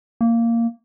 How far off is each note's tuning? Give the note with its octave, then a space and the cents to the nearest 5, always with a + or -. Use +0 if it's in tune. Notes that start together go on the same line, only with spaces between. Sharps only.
A#3 -10